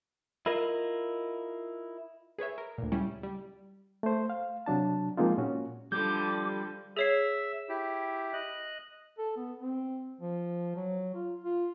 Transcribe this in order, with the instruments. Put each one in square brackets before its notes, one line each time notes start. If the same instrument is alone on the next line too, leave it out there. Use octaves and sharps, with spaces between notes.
[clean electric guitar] E4 F4 A#4 D#5
[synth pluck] G#4 B4 C#5 E5
A#4
D2 A#2
C#3 G3 C#4 E4
G3
[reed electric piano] A3 C5
F5
C3 F#3 D4 A5
F3 G#3 A#3 C4 D#4 F4
A#2 C#4 F#4
[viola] D3 F3 [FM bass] G3 [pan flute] D6 [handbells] G6
[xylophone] G#4 C#5 C7 [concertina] E5 E6
[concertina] E4 G4
D#5 F#6
[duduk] A4
B3
C4
F3
F#3
F4
F4